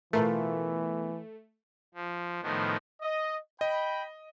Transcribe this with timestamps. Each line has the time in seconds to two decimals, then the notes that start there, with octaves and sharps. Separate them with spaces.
0.13 B2 E3 A3 F4 A#4
1.94 F3
2.42 A2 D#3 F3 B3
3.02 D#5
3.61 D#5 G5 B5